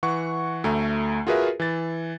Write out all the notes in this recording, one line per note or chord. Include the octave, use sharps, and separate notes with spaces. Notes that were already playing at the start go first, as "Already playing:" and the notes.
E3 F#5 C#6
D2 A3 A#5
F4 F#4 G#4 A#4 B4 E5
E3 A6